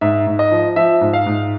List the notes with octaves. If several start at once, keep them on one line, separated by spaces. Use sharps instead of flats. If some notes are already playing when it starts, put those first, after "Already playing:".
G#2 E5
G#2
D#5
F3
F3 E5
G#2
F5
G#2